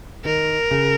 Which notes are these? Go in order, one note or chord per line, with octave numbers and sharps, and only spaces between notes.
D#3 A#4
C#3